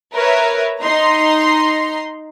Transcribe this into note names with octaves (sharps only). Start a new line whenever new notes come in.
A#4 B4 C#5 E5
D#4 A#5 C6